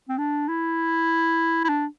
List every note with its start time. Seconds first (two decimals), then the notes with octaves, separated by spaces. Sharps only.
0.09 C4
0.18 D4
0.49 E4
1.64 E4
1.69 D4